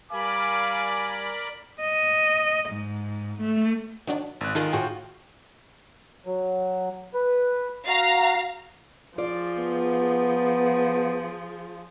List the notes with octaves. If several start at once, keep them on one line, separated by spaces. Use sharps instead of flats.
G3 A#4 D5 F5 G#5 B5 D6
D#5
G#2
A3
D#3 F#3 D4
G#1 F#6
D#3 F4 G#4 A4 D#5
A2 F4 F#4 G#4 G5
F#3
B4
F#4 F5 A#5
F3 F4 G#4 D5
B3